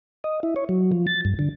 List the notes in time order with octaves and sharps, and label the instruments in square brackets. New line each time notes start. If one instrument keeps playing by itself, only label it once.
[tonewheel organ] D#5
E4
C#5
F#3
F3
A6
G2
D3